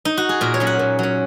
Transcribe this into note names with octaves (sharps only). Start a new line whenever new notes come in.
D#4
F#4
G#4
A#2 A#4
C#5
F#3 C#4
F#5
A#2
F#3 C#4